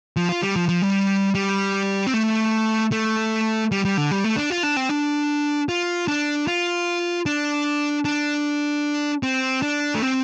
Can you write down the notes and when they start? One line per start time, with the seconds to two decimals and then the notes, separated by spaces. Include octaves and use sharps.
0.17 F3
0.29 F4
0.42 G3
0.56 F3
0.69 F3
0.82 G3
1.35 G3
2.07 C4
2.13 A3
2.92 A3
3.72 G3
3.85 G3
3.97 D3
4.11 G3
4.24 A3
4.36 D4
4.50 F4
4.63 D4
4.77 C4
4.89 D4
5.69 F4
6.08 D4
6.47 F4
7.26 D4
8.05 D4
9.23 C4
9.62 D4
9.95 A3
10.02 C4